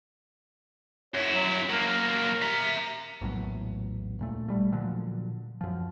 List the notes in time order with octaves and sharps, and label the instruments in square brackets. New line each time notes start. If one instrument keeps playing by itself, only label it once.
[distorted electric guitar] F#2 E4 [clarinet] C#5
[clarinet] F#3
[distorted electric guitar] F#3 A#3 [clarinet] A#4
[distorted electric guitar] E5 A#5
[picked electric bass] A#1 E2 A2 F#3
D1 A#2 A3
G#1 G3 A3
A#2 D3 F3 F#3
F#2 F3